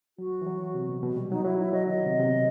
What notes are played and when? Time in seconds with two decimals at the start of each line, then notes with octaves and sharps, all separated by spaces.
0.18 F#3 F#4
0.42 E3
0.46 F#3
0.75 C3
0.89 B2
1.03 B2
1.17 G3
1.32 F#3 D#4
1.45 F#3 E4
1.59 E4
1.73 F#3 D#5
1.87 D#3 D#5
2.06 C3
2.20 C3
2.25 B2